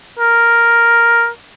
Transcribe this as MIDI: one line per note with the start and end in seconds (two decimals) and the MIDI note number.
0.19 1.28 70